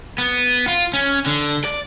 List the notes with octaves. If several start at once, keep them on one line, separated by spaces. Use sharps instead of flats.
B3
F4
C#4
D3
D5